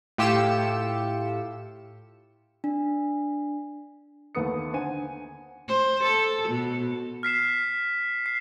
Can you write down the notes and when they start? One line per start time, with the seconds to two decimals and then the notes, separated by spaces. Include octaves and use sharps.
0.18 A2 F4 G4 E6 C#7 E7
2.64 D4
4.35 D#2 A3 B3 D#6 C#7
4.73 D3 C5 F#5 G#5 D#7
5.68 C5
6.04 A4
6.49 B2
7.23 F6 B6 C7 E7
8.26 C7